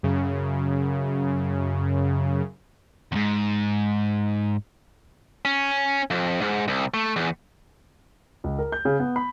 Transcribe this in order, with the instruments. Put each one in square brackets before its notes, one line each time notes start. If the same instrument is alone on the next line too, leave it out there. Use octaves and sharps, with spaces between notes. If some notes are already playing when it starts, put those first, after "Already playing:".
[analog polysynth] F#2 C#3
[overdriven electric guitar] E2 G#2
[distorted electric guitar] C#4
F2
G#2
C2
A3
E2
[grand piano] C#2
A#4
G6
C#3
B3
B5